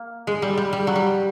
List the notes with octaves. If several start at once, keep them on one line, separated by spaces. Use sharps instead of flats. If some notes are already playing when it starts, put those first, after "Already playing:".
Already playing: A#3
G#3
G3
G3
G3
F#3
G3